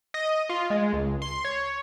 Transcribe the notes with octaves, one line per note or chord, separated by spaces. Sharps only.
D#5
F4
G#3
C#2
C6
C#5